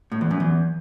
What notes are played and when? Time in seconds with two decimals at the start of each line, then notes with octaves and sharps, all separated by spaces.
0.12 A2
0.21 E2
0.31 F#2
0.40 E2